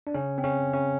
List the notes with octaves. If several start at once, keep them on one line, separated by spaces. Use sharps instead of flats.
D4
C#3 C#4
C4
C#3 C#4
C#3 C#4